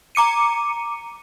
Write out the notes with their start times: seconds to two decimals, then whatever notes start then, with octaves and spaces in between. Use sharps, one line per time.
0.15 A#5 D6 C#7 D#7